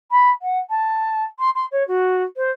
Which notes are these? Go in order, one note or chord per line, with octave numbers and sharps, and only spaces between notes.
B5
F#5
A5
C6
C6
C#5
F#4
C5